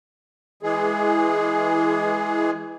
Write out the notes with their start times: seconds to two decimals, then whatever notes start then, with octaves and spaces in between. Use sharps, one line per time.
0.63 E3 G#3 G#4